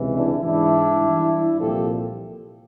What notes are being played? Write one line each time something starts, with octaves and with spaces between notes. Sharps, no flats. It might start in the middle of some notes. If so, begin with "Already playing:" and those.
Already playing: C#2 C3 E3
D4 E4
G#2 E3 D4 E4
G2 E3
C2 A#2 F3 G4 A4